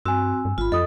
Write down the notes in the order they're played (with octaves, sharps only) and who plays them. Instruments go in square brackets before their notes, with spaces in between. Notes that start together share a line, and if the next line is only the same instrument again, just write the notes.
[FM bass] G2 [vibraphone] C4 F#4 [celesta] G#5 E6
[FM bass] G2
[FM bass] G#1 [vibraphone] F4 B5
[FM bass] F2 [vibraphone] A4 [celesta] D#5 D#6